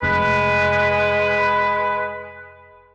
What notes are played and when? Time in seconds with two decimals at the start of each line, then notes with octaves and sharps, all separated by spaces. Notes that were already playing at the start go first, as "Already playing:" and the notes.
0.03 F1 G#3 B4